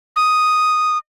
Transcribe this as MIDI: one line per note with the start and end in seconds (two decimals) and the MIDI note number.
0.16 0.98 87